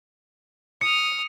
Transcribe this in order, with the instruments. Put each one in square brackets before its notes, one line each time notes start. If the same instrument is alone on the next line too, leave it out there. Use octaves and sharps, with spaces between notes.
[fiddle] D#6 F6 [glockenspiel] C#7